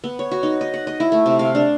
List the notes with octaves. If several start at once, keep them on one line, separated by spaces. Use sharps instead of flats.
B3
C#5
F#4
D#4
D#5
F#5
D#5
E4
A3
C3
F5
D4